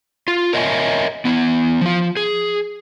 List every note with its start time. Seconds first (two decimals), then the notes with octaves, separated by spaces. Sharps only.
0.28 F4
0.53 A#4 C#5 D#5 E5 G5 G#5
1.25 B3 E4
1.81 F3 F4
2.17 G#4